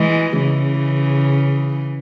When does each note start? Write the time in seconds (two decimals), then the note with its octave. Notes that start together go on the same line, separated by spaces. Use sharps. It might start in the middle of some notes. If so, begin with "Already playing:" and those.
Already playing: E3 G#3
0.39 C#3 E3